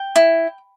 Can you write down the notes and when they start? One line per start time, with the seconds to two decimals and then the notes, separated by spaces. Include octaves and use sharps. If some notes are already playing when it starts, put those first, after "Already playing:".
Already playing: G5
0.16 E4